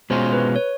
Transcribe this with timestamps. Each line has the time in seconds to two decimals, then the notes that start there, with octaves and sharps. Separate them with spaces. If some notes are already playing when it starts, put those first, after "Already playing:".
0.10 B2 G#3 C#4 F4 C5
0.33 B4
0.56 C#5